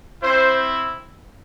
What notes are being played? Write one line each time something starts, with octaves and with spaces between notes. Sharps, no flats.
C4 E4 C5